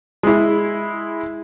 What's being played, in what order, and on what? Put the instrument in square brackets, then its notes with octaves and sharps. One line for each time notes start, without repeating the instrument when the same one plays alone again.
[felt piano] G#3 E4